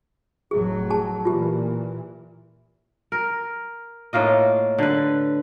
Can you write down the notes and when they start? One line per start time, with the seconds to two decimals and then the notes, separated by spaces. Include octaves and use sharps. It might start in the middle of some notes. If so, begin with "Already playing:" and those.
0.51 F1 A2 F#3 G#4
0.90 G#4 A5
1.25 A#2 E3 F4 G4
3.12 A#4
4.13 A2 A#3 F4 D#5
4.78 D3 B4